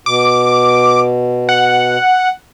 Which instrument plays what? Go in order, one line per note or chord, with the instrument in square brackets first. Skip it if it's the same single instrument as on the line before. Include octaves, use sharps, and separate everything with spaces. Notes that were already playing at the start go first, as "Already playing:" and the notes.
[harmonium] B2 [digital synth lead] D6
[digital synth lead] F#5